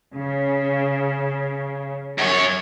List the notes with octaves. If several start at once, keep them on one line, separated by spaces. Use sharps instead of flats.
C#3
F#2 C#5